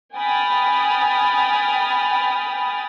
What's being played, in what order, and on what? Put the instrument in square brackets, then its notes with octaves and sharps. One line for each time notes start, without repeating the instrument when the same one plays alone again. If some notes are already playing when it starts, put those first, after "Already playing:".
[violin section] G5 G#5 B5 D#6 F6 A6